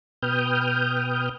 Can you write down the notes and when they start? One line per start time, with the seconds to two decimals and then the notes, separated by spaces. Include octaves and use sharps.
0.22 B2 B4 G5 D#6 F6 G6